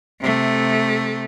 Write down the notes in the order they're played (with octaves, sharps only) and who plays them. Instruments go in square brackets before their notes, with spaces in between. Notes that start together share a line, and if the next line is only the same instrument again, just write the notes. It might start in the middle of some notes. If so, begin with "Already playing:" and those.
[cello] C3 A3